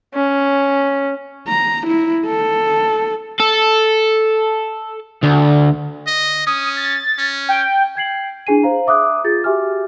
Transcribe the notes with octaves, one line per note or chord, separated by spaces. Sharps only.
C#4
A#5
E4
A4
A4
D2
D#5
C#4 D#6
A6
C#4
G5
G5 G#6 C7 F#7
D4 E4 G#4 G#5 C7 D#7
C5 F5 A#5
E5 D6 D#6 F#6
F4 G#4 G6 A6
F#4 G4 E5 G#5 D6 F6